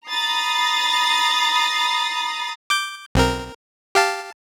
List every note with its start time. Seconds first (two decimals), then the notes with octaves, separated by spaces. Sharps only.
0.11 A#5 B5 D#6 A6 A#6 C7
2.70 D6 G6
3.15 B1 C4 A#4
3.95 G4 F5 A5